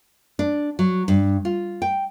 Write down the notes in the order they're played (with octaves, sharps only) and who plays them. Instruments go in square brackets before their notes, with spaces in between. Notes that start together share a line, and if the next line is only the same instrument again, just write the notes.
[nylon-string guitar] D4
F#3
G2
F4
G5